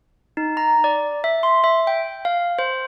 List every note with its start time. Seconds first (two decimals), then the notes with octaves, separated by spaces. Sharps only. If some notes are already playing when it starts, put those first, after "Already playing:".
0.37 D#4
0.57 A#5
0.84 D5
1.24 E5
1.43 C6
1.64 E5
1.87 G5
2.25 F5
2.59 C5